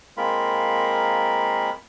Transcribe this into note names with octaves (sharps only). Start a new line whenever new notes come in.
G#3 A#3 C4 F4 A#4 B5